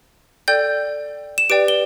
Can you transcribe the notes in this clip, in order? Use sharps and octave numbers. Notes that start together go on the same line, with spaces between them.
A4 D5 G5 G6
E7
G4 B4 D5 G5 D7
G7